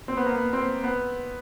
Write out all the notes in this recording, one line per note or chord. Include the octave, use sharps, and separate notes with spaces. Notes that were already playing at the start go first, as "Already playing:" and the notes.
C4
B3
A#3
B3
C4
B3